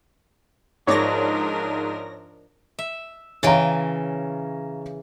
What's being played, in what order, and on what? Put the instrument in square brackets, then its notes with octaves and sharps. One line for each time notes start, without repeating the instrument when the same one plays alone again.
[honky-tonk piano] G#2 [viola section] F3 D4 A#4 [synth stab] C#5 D5 A#6
[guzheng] E5
[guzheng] C#3 E3 G5 [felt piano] C#5 F5 A#5